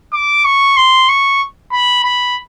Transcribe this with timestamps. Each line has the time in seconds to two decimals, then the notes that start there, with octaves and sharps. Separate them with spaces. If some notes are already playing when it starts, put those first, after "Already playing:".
0.12 D6
0.45 C#6
0.77 C6
1.09 C#6
1.72 B5
2.04 B5